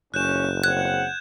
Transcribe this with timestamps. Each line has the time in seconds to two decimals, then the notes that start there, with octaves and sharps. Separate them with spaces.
0.14 F#1 C#4 F#6 G6 E7
0.64 C#3 C4 F#5 F#6 G#6